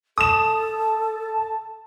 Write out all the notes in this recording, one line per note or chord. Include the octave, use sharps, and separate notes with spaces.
A4 A5 D#6 E7